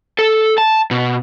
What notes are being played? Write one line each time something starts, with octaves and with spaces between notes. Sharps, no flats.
A4
A5
B2